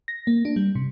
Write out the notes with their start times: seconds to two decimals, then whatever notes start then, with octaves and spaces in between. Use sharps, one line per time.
0.08 A#6
0.27 A#3
0.45 D4
0.56 G3
0.75 C3